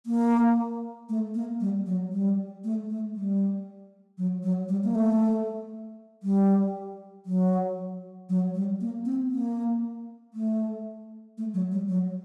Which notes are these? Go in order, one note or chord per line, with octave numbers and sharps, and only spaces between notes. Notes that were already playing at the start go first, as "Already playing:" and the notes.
A#3
A3
A#3
G3
F#3
G3
A3
A3
G3
F#3
F#3
G3
A#3
A3
G3
F#3
F#3
G3
A#3
C4
A#3
A3
A3
F#3
G3
F#3